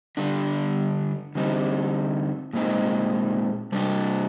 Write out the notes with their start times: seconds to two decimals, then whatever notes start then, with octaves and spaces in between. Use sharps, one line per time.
0.17 D3 G3 D4
1.35 D3 G3 C4 D#4
2.53 A#2 G#3 C4 D#4
3.72 C3 G3 D4